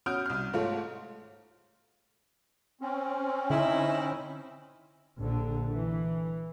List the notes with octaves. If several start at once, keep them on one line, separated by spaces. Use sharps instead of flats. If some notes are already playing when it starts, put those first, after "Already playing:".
C#4 F#4 D#6 F6 G6 D7
C2 F6
G#2 A3 F4 C#5
C4 C#4
D3 D#4 E4
A#1 D3
E3